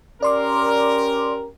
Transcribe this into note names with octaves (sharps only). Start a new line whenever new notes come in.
C#4 G4 A#4 D5 C6 D6